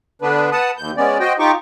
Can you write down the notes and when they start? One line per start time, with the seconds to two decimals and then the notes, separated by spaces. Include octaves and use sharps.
0.22 D3 B3 D4 B4
0.52 B4 F#5 A5 D#6
0.78 D#2 G6
0.97 G#3 B3 C#4 D5
1.20 F#4 C5 D#5 G5
1.39 D#4 F4 G4 C#6 D6